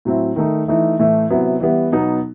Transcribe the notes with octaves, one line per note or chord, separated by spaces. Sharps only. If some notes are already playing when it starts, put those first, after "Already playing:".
A2 F#3 C4 E4
D#3 A3 D#4
E3 A3 D#4
A2 E3 A3 E4
C3 F#3 B3 E4
E3 G3 B3 E4
B2 F#3 B3 D#4